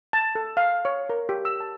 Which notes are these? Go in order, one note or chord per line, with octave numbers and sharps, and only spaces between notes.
A5
A4
F5
C#5
A#4
G4
E6
A5